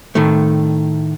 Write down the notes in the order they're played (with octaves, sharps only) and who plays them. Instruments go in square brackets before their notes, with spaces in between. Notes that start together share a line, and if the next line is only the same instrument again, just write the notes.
[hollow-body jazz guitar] A2 D#3 A3